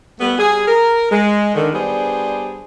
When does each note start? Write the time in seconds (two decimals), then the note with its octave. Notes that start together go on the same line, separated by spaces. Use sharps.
0.20 G3 A3 B3
0.38 G3 G#4
0.67 A#4
1.11 G#3
1.55 D3 D#3
1.73 G3 B3 D4 G#4 C5